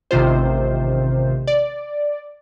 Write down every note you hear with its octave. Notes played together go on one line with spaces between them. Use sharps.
A1 C3 D#3 F4 C5
D5